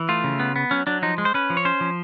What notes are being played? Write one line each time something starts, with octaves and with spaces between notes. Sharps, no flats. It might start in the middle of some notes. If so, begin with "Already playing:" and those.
Already playing: E3
A3 F4
C#3
B3
B3
F#3 C#4
F#3 D4
F3 D#4
G#3
C5
C#4 B4
F3
C#5
C#4 C5
F3